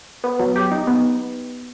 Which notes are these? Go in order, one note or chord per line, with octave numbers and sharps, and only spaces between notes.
B3
F#3
G4
D#4
B3